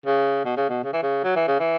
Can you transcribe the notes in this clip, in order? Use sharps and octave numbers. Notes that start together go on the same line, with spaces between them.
C#3
B2
C#3
B2
C#3
E3
C#3
F#3
E3
C#3
E3